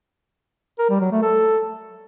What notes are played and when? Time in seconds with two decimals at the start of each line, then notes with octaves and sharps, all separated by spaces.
0.79 A#4
0.90 G3
1.01 F#3
1.12 A3
1.22 A4